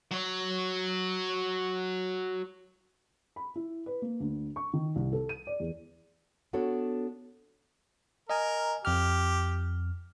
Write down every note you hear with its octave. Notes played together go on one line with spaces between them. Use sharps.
F#3 C#5
B5
E4
B4
A#3
D2
C#6
D#3
C2
A4
D#7
D5
E2
B3 D4 F#4 A4 C#5
A#4 D#5 G#5
F2 G4 F6